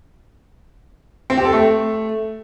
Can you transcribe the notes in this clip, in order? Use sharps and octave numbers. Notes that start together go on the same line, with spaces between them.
C4
G4
A4
A3